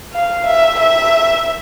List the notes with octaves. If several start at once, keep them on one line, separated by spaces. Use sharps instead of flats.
F5
E5
E5